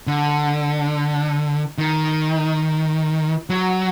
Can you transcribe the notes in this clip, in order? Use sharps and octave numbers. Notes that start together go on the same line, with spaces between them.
D3
D#3
F#3